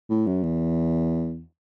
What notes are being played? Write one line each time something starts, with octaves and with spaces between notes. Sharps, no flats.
A2
F#2
E2